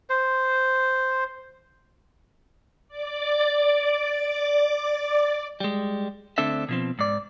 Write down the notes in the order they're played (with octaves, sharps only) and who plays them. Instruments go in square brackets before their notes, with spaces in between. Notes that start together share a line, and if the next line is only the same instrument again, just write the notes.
[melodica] C5
[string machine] D5 D6
[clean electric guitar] G3 G#3
D2 C4 D4 A4 E5
B2 F3 C4
G#2 D5